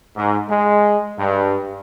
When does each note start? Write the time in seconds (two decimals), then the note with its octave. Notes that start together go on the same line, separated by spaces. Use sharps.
0.15 G#2
0.49 G#3
1.18 G2